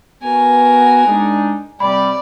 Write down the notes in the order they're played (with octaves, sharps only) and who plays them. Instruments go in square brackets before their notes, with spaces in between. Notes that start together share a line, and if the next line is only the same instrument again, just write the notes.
[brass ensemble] B3 F#4 [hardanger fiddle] A#4 G#5
[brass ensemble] G#3 D4 D#4
[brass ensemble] C3 G3 [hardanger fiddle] D5 [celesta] B5